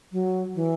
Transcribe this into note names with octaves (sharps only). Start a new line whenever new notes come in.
F#3
E3